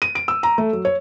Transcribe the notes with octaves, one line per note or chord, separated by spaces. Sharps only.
D#7
D7
E6
A#5
A3
F#3
C#5